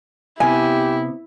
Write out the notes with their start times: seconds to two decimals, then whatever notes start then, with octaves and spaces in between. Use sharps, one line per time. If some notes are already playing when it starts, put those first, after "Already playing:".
0.40 C3 B3 E4 G4 G#5